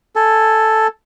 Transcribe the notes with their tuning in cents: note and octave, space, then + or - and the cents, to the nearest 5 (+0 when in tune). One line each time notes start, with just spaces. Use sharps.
A4 +0 G#5 +0